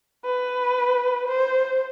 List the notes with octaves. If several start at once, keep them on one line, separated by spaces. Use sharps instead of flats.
B4
C5